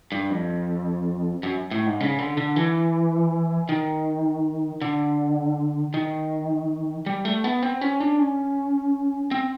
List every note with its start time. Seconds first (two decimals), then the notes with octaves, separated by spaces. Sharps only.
0.12 G2
0.30 F2
1.43 F#2
1.71 A2
1.86 G#2
2.00 C#3
2.19 D3
2.37 D3
2.56 E3
3.69 D#3
4.81 D3
5.94 D#3
7.06 G3
7.25 A3
7.44 B3
7.63 C4
7.81 C#4
8.00 D4
8.19 C#4
9.31 C4